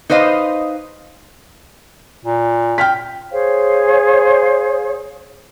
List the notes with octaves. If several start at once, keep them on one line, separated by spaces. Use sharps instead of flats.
D#4 B4 C5 D#5 F5
A#2
G5 F6 B6
G#4 C5 C#5 F5